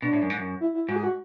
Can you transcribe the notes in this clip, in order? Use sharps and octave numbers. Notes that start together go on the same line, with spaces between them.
B2 D4
A2
F#2
G#2
F#2
E4
E4
G#2 F#4
G#4
F#4